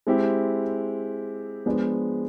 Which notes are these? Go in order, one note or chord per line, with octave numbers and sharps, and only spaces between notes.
G#3 C4 E4 G4
F3 G#3 B3 D4